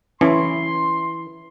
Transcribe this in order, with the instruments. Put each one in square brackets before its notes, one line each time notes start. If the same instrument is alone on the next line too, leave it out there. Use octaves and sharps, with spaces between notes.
[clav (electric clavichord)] E3 [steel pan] C#4 E4 [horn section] C6